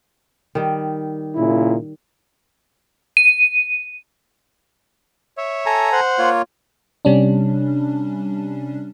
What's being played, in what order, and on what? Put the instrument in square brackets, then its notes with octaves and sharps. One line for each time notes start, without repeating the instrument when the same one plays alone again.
[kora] D#3 G3
[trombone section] A#2 C#3 E4
[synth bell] D#7
[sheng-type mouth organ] C#5 E5
[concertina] A4 G#5 A#5
[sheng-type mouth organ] C5 F#5
[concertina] A#3 F4 C#5
[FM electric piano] C3 G3 C#4 D4